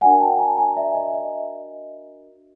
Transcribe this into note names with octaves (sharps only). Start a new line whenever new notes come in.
D4 F#4 A#4 D5 F#5 G#5
G5 A5
G#5 A#5
G#5 A#5
D5 E5
D#5
D#5